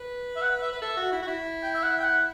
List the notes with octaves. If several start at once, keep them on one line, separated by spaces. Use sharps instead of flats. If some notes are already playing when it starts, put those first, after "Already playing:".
Already playing: B4
E5
F#5
E5
B4
A4 E5
F#4
E4
F#4
E4
G5
E5
F#5
G5
F#5